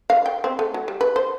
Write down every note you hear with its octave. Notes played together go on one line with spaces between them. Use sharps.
F5
G5
C4
A3
F#3
G3
B4
C5